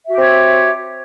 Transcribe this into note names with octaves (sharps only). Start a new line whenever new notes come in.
C4 F#4 G4 C#5 E5